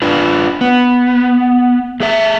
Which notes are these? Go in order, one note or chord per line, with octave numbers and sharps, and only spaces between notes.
D4 F4 B4
B3
A3 G#4 E5